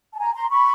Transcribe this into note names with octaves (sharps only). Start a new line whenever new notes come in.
A5
G#5 A#5
A#5 C6
B5 C#6